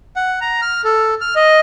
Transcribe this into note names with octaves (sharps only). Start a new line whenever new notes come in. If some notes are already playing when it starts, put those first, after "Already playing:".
F#5
A#5
F6
A4
F6
D#5